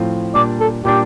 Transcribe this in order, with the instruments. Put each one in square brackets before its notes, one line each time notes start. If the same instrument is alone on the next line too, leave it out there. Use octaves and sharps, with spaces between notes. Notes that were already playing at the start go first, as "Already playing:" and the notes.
Already playing: [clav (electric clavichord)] A2 F3 C4 F4
[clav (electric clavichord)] A#2 G3 D4 [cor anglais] D5
[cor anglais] A4
[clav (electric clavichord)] A#2 G3 D4 [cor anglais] G4